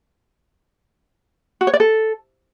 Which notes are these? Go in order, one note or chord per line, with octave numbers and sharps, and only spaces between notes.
F#4
C#5
D5
A4